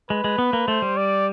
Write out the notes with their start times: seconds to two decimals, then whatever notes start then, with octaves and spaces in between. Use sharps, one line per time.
0.10 G#3 B4
0.24 G#3
0.38 B3
0.53 A#3
0.68 A3 C5
0.82 G3
0.97 D5